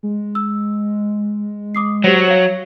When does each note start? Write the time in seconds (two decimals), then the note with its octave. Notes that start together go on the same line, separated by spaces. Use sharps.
0.03 G#3
0.35 E6
1.75 D6 D#6 C7
2.04 F#3 G4 C5 C#5
2.28 C#5 F5